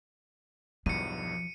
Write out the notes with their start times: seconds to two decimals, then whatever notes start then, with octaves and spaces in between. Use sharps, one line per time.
0.86 B1 E2 G2 F3 C#7 D#7